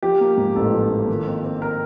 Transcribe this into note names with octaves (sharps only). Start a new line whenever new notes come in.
F3 G4
A#3
G#2
A1 A4
F3
A#3
D#3
C4
C4
C4 A#4